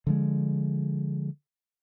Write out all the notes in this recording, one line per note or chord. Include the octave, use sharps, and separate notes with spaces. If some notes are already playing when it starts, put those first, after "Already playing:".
D3 F3 G#3